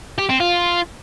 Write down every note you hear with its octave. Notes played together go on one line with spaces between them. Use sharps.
G4
C4
F4